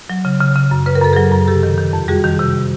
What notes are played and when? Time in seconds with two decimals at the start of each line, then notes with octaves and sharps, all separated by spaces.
0.10 F#3
0.25 C#3
0.41 C#3
0.56 C#3
0.71 F#2
0.86 C#3 B4
0.95 A#4
1.01 F#2 A4
1.13 F#3 G#4 A#4
1.31 F#2
1.47 C3 G4 A4
1.63 D#3
1.78 D#3
1.93 F2
2.08 G3 F#4 G#4
2.24 D#3
2.39 C3